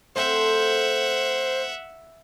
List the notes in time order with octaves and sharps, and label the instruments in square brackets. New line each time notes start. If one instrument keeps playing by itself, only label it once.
[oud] A3 C4 [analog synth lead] C5 [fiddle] E5 F#5